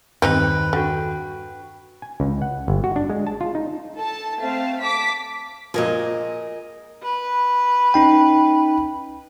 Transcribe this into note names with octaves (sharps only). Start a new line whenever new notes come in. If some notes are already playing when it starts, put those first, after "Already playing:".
E2 G2 D#3 C4 D#4 G4 B4
D3 F#4 G5
G#5
C#2
F#5
G1
F#4
D4
G#3
A5
F4
D#4
A4 A5
A3 C4 F5 A5
A5 D6 B6
A#2 F3 G#4 A#4 D#5
B4
C#4 D#4 G5